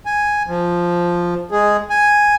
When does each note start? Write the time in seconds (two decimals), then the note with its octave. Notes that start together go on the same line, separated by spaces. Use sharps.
0.06 G#5
0.47 F3
1.51 G#3 G#4
1.90 G#5